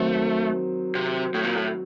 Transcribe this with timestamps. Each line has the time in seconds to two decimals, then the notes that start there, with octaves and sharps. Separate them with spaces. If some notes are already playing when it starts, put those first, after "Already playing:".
Already playing: D#3 F#3 A3 C4
0.95 C3
1.34 A2
1.45 A#2
1.55 A2